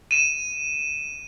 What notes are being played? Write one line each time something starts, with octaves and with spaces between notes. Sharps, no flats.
D#7 E7